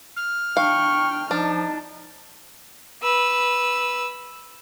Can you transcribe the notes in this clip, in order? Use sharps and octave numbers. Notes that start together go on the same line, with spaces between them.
F6
D4 F5 G5 C#6
F3 D4 D#4 A5
B4 E6